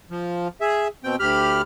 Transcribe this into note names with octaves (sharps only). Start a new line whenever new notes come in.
F3
G#4 E5
B2 C4 G5
D2 G4 B5 F6